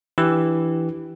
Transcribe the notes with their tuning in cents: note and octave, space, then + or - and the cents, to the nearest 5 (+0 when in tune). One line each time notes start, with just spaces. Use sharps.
E3 +0 D4 +0 G4 -15